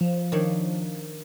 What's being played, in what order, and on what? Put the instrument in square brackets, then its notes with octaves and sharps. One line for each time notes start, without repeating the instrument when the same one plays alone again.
[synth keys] F3
[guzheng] D#3 D4 C#5